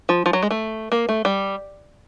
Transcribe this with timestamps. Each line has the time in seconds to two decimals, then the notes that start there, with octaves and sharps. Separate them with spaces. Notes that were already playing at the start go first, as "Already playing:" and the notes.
0.09 F3
0.26 F3
0.33 F#3
0.42 G#3
0.51 A3
0.92 A#3
1.09 A3
1.25 G3